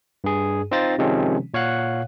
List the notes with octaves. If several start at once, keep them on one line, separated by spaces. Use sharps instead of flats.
G2 G#4
C4 D#4 F4 C5 A6 A#6
C3 D#3 F3 G#3 C4 C#4
A#2 C#5 F5 F#5 F#6